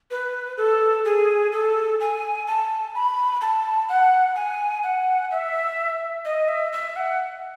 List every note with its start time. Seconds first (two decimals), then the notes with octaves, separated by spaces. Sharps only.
0.11 B4
0.57 A4
1.05 G#4
1.52 A4
2.00 G#5
2.47 A5
2.95 B5
3.41 A5
3.89 F#5
4.36 G#5
4.83 F#5
5.31 E5
6.25 D#5
6.48 E5
6.72 E5
6.96 F#5